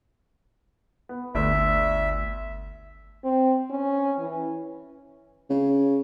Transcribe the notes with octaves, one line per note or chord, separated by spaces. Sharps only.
B3
G1 D2 A3 D4 E5
C4
C#4
E3
C#3